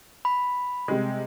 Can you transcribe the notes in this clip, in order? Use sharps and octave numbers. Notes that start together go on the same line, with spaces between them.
B5
C3 G3 G#3